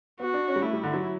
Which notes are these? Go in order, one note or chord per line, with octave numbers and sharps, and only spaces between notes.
B3 F#4
D4
C#4
G3
A3 E4
G3
D3
F#3